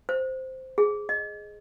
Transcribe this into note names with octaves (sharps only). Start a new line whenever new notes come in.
C5
G#4
D#5